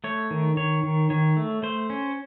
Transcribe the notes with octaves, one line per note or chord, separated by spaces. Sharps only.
A3 C#5
D#3
D#3 C#5
D#3
D#3 C#5
A3
A3 C5
C#4